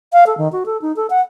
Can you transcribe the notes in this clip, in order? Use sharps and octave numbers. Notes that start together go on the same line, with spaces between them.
F5
A4
D#3
F#4
A4
D#4
A4
F#5